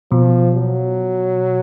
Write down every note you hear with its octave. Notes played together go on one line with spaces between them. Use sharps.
B2 F3
F#3